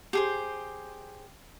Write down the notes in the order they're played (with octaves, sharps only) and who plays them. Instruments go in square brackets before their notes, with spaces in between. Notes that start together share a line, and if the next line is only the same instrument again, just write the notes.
[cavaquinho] G4 G#4 C5